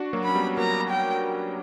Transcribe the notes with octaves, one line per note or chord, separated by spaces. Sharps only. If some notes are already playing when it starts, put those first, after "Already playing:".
Already playing: D4 F#4
F#3 A#3
C#4 B5
G3 B3
F#3 A#3 A#5
G5